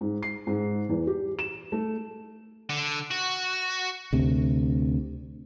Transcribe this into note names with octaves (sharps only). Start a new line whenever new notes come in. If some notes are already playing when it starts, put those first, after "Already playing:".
G#2
C7
G#2
E2
G4
E7
A3
D3
F#4
D2 C3